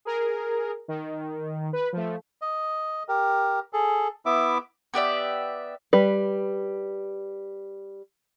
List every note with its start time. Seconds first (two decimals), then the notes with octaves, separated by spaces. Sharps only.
0.05 G#4 A#4
0.88 D#3
1.73 B4
1.93 F3 A3
2.41 D#5
3.08 G4 A#4
3.73 G#4 A4
4.26 B3 E4 E5 D6
4.94 B3 G4 D5 E5
5.93 G3 B4